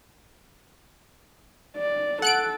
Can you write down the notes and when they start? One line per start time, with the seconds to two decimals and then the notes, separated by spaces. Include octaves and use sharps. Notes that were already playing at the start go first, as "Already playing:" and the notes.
1.77 D5
2.22 A4 F#5 F#6 D7